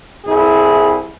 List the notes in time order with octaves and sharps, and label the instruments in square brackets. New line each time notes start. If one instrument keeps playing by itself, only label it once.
[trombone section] C2 E4 G#4